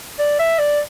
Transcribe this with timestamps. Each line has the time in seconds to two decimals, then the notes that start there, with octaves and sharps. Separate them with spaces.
0.19 D5
0.39 E5
0.58 D5